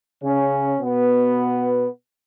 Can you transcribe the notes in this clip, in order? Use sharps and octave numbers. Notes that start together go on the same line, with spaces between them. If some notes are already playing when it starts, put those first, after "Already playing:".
C#3 C#4
B2 B3